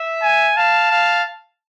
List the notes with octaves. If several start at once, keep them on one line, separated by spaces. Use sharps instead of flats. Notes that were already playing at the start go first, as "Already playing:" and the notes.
Already playing: E5
G#5
F5 A5
F5